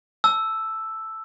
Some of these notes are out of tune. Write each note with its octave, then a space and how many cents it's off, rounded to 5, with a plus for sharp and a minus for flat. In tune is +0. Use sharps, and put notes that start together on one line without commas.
A5 +0 E6 +0